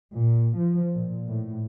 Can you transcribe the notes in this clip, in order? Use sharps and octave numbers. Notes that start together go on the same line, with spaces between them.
A#2
F3
A#2
A2